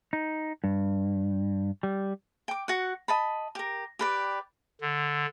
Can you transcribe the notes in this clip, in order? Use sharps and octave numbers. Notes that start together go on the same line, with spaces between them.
D#4
G2
G3
G5 D6
F#4 F#5
D#5 A5 B5
G4 A#4
G4 B4 D5
D3